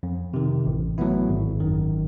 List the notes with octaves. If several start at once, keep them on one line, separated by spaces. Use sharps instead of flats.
F2
C3 D#3
A1
A2 F#3 B3 E4
G#1
F#2 D#3